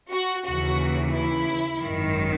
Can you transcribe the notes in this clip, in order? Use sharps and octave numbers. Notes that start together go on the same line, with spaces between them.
F#4
D#2 C#3 E3 F#4
E4
G#1 F#2 D#3